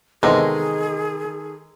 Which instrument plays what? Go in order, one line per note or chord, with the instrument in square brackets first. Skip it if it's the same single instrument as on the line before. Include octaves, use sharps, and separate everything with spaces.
[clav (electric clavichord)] E2 C3 [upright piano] D#3 A4 [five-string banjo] G#3 D#4 [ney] G#4